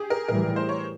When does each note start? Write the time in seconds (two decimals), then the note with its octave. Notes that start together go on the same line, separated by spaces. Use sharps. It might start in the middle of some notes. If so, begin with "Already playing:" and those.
Already playing: G4 G#4
0.10 A#4
0.28 A2 E3 G3 A#4
0.56 C5
0.69 C#5